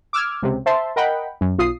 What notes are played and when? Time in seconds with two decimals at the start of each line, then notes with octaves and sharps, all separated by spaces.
0.13 D6 E6 F6 G#6
0.43 C#2 C3
0.66 C5 E5 A5 C6
0.96 A#4 D#5 F#5 G5 B5
1.41 F#2
1.58 B1 F4 D#6 C7